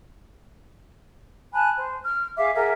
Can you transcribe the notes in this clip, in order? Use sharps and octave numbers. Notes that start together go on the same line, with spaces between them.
G#5 A5 B5 F#6
C5
F6
G#4 E5 F5 D6
G#4 A#4 E5 F#5